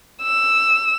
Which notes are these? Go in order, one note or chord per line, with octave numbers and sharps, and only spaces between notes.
E6